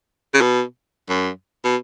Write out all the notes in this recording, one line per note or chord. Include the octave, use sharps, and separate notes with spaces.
C#3
B2
F#2
B2